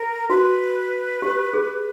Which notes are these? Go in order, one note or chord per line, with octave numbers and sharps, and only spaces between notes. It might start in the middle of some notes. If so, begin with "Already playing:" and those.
Already playing: A#4
F#4 B4
G4
G#4